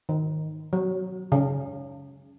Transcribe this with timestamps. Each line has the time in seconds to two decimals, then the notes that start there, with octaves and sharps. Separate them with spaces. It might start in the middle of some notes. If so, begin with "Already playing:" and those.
0.09 D#3
0.73 F#3
1.32 C#3